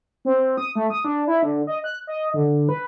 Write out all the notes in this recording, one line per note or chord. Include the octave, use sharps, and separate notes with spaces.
C4
D#6
A3
D#6
D4
E4
D3
D#5
F#6
D#5
D3
B4